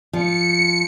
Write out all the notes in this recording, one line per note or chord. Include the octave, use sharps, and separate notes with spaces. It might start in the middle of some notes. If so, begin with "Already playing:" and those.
F3 C#7